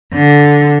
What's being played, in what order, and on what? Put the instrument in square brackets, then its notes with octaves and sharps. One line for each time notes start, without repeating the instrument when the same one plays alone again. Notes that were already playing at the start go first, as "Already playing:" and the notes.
[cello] D3